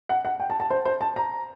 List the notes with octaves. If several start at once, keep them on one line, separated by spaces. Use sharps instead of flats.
F#5
F#5
G5
A5
A5
C5
C5
A5
A#5